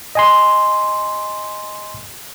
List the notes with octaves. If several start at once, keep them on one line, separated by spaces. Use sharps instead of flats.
D#5 G#5 C6